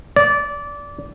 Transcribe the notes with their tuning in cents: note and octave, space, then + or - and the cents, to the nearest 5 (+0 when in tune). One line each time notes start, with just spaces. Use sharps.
D5 -20